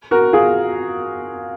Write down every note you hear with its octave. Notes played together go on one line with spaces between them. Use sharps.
F#4 A#4
F4 G#4